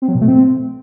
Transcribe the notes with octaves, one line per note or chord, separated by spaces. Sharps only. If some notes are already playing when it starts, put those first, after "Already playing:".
C4
F#3
B2
A3
C4